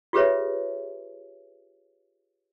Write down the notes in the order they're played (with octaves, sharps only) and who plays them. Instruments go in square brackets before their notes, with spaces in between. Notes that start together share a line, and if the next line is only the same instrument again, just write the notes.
[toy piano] F4 G4 G#4 B4 C#5 E5